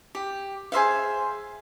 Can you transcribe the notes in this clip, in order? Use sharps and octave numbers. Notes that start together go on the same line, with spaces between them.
G4
G#4 C5 E5 F5